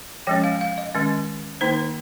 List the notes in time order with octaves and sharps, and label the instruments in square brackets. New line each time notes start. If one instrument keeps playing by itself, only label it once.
[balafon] F3 G#3 C#4 G5
F5
F5
D#5
D#3 G#3 C#4
D#3 A#3 D#4 C5